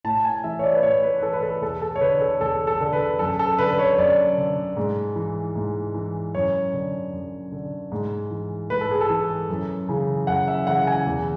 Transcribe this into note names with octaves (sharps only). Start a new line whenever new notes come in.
A2 A5
G#5
E3 E5
C#5
D5
B4
A2 C#5
B4
B4
E3 A4
B4
A4
E2 A4
A4
C#5
D3 B4
A4
E2 A4
A4
D3 A4
B4
F#2 A4
A4
D3 B4
B4
C#5
F#2 D5
D3
G#2
E3
G#2
E3
F#2 C#5
D3
F#2
D3
G#2
E3
G#2 B4
A4
G#4
A4
E3
F#2
C#3 E3
F#2 F#5
E5
C#3 E3 F#5
G#5
E2